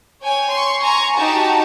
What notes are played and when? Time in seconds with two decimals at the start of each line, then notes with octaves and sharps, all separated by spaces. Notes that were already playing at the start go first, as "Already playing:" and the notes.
0.21 C#5 G5 G#5
0.50 C6 C#6
0.81 G#5 A#5 C#6
1.16 D#4 F#4 G4 A5